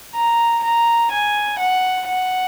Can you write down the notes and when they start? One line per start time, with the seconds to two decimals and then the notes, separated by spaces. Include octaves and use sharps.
0.15 A#5
0.63 A#5
1.11 G#5
1.59 F#5
2.07 F#5